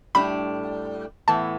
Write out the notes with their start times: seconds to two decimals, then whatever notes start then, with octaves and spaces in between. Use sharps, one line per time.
0.15 A2 G3 D4 B5
1.28 A2 E3 B3 A5